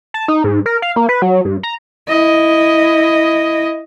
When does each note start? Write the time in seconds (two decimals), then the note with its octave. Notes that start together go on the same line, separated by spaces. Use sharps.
0.14 A5
0.28 D#4
0.44 G#2
0.66 A#4
0.82 F5
0.96 A#3
1.09 B4
1.22 F#3
1.45 G2
1.63 A#5
2.09 E4 D#5